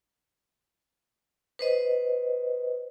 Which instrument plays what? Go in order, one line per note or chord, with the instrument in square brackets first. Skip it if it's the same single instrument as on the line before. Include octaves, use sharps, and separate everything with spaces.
[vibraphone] B4 C5 D#5